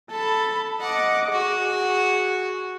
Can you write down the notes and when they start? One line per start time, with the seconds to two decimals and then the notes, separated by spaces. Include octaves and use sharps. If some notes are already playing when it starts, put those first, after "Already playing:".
0.10 A4 A5 B5
0.81 D#5 F#5 D6
1.33 F#4 G#4